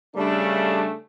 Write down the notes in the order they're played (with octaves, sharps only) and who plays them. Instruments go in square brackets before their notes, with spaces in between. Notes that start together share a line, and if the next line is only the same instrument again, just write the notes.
[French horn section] C#3 A3 D4 [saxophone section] G3